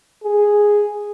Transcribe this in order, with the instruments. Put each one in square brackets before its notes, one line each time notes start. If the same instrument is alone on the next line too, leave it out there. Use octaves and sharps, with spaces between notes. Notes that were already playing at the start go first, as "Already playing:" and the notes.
[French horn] G#4